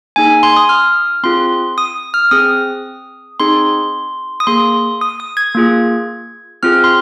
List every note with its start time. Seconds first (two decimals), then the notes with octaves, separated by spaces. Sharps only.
0.16 A#3 D#4 G#4 G#5
0.43 C6
0.57 D#6
0.69 F6
1.23 C4 F4 G#4 C6
1.78 D#6
2.14 F6
2.31 C4 G#4 D#6
3.40 C4 D#4 G#4 C6
4.40 D#6
4.47 A#3 G#4 C6
5.01 D#6
5.20 D#6
5.37 G#6
5.55 A#3 F4 G#4
6.63 C4 F4 G#4 F6
6.84 C6